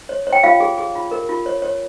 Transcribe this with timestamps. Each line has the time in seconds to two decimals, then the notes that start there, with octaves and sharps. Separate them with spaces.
0.09 C#5
0.27 C#5
0.33 G5
0.43 F4 F5
0.60 G#4
0.78 G#4
0.95 F4
1.11 A#4
1.29 F4
1.46 C#5
1.62 C#5